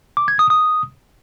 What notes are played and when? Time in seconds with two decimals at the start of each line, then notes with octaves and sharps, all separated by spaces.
0.17 D6
0.28 G#6
0.39 D#6
0.50 D#6